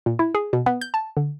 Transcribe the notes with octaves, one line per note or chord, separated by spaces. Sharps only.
A#2
E4
G#4
B2
B3
G6
A5
D3